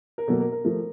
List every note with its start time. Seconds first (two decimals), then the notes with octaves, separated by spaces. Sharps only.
0.18 A#4
0.27 B2 F#3 A#3 A4
0.40 A#4
0.52 A#4
0.65 F3 A3 A#4